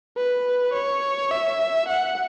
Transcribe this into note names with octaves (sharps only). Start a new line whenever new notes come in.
B4
C#5
E5
F#5